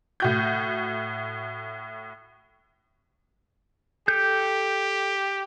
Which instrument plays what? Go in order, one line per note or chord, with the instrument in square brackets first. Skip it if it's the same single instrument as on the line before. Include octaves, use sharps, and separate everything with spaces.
[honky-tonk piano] A2 F#4 G6
[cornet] G4 [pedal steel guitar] A4 G6